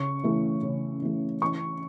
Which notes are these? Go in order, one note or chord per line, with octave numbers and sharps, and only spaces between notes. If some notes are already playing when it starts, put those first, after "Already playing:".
Already playing: C#3 C#6
E3 A3
C#3
E3 A3
E3 C#6